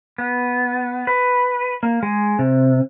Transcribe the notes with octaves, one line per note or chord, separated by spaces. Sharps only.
B3
B4
A#3
G#3
C3